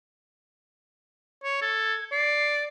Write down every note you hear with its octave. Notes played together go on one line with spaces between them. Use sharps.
C#5
A4 G#6
D5 C7